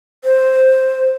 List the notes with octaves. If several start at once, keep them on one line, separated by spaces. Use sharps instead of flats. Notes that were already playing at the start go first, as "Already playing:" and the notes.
C5